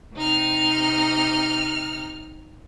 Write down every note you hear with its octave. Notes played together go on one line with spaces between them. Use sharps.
C3 D#4 F6